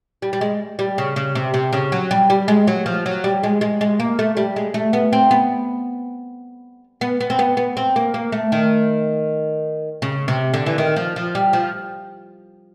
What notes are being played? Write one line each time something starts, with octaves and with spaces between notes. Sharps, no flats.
G3
G3
G#3
G3
C#3
C#3
C3
C3
C#3
F#3
G3
G3
G#3
F#3
F3
F#3
G3
G#3
G#3
G#3
A#3
A3
G3
G#3
A3
B3
C4
B3
B3
B3
C4
B3
B3
C4
A#3
A#3
A3
D#3
C#3
C3
D3
E3
D#3
F3
F3
G3
F3